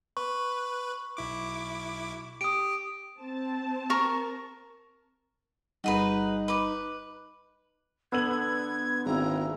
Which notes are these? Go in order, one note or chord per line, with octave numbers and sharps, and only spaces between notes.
B4 C#6
B1 E4 D6
G4 D#6 D7
C4 A5
A#4 C#6
G1 G3 D#4 F#4 G#4 B4
B4 D6
D3 B3 E6 G#6 F#7
G#1 A#2 E5 A#5